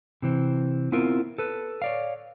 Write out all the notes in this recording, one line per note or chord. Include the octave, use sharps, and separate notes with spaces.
C3 E3 C4
B3 C4 E4 F4 A#4
A4 B4
C#5 D5 F5